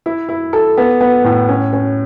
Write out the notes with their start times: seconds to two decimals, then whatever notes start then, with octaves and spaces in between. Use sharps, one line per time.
0.06 E4
0.29 E4
0.53 A4
0.78 B3
1.01 B3
1.24 A2
1.49 C#4
1.73 C#4